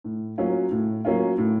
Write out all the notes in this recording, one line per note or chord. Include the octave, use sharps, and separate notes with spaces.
A2
F#3 A#3 C#4 F4
A2
F#3 A#3 C#4 F4
A2